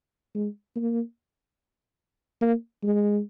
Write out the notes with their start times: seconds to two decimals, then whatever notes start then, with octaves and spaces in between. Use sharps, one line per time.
0.35 G#3
0.76 A#3
2.41 A#3
2.83 G#3